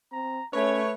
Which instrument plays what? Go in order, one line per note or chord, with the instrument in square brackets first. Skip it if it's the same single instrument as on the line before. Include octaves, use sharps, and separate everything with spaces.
[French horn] C4 [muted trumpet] A#5
[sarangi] A3 [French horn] C#4 [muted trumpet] B4 [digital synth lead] C#5